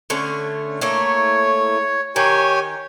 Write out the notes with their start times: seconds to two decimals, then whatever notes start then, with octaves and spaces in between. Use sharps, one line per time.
0.10 D3 A3 C#4
0.81 A3 A#3 E4 C#5
2.16 D#3 G4 C#5 G#5